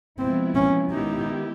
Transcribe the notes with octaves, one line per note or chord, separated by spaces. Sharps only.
C3 F3 G#3 B3 C4 E4
C#4
D#3 G#3 B3 D#4 E4 G4